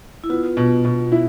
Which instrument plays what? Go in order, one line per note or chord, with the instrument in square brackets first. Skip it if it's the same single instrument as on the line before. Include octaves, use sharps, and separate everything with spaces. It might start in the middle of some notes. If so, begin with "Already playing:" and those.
[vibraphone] E4
[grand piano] B3 [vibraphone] F4
[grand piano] B2
B2
E4